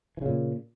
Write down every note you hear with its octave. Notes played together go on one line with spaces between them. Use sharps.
A#2 C#3 E3